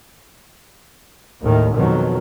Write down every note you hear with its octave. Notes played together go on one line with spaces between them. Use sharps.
D#2 A2 D#3
F2 B2 D#3 F#3